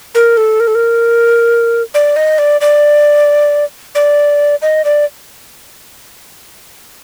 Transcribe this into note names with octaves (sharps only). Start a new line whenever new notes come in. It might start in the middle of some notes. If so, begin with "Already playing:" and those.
A#4
A4
A#4
A4
A#4
D5
D#5
D5
D5
D5
D#5
D5